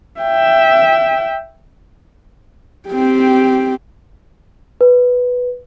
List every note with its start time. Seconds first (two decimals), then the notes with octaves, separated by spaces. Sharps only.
0.20 E5 G5
2.89 C4 G4
4.81 B4